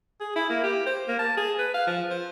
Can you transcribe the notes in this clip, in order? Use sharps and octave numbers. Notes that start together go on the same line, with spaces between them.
G#4
E4
A#3
G4
C5
A#3
A5
G#4
B4
F5
F3
C5